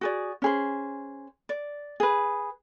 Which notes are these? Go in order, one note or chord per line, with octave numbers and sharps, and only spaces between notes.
F#4 G#4 D5
C#4 G#4 C5
D5
G#4 B4